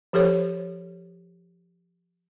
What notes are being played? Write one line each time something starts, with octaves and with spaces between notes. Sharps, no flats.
F3 G4 A4 C5 C#5